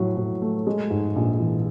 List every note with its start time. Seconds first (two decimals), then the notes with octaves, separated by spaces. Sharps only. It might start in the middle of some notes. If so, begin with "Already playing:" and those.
Already playing: A2 F#3
0.17 A2
0.42 A3
0.67 G#3
0.90 G#2
1.16 A#1
1.39 E3